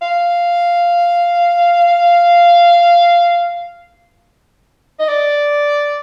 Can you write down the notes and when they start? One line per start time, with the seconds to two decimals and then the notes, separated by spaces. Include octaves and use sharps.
0.02 F5
4.99 D#5
5.08 D5